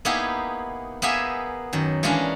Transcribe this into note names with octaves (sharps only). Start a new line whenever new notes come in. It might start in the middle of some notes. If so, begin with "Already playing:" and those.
A#3 B3 D#4 E4 G4 G#4
A#3 B3 G4 G#4 E5 G#5
F#2 D#3
E3 G#3 A#3 C#4 D4